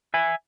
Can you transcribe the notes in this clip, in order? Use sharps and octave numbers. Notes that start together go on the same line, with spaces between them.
E5 G#5